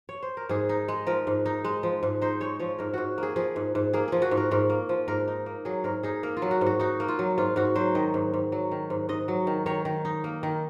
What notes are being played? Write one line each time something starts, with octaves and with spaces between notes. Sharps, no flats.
C#5
C5
A#4
G#2 G#4
D#4
G#3
F3 A#4
G#2
D#4
G#3
F3
G#2
D#4 C5
G#3 C#5
F3 C#5
G#2 A#4
G#2 F#4
A#3 G#4
F3 G#4
G#2
G#2
A#3 G#4
F3 G#4
F#4
G#2
A#4
G#2 A#4
A#3
F3
G#2 A#4
D#4
A#3
F#3 G#4
G#2 A#4
D#4 G#4
A#3 A#4
F4
F#3
F#4
G#2
F#4
D#4 F#4
A#3
F4
F#3
G#2 F4
G#2 F#4
F#3 C5
D#3 D#5
G#2
G#2
F#3
D#3
G#2
G#2 D#5
F#3
D#3
D#3 C#5
D#3
D#4
A#3
D#3